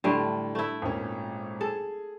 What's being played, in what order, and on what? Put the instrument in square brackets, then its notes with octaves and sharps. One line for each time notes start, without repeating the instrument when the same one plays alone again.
[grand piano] A2 [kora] D3 G3 A3
[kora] A3 E4
[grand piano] G#1 A#2 C#4
[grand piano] G#4 [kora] A4